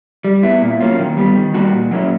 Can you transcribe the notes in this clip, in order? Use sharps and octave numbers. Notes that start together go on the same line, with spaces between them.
G3
B3 E4
A#2
F#3 A#3 C#4 F4
D#3
G3 B3
D#3
G3 A#3 D#4 F#4
A#2
F#3 A#3 C#4 E4